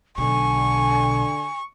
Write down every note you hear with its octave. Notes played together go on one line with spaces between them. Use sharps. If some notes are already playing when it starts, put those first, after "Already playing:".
B1 B2 D3 G#5 C#6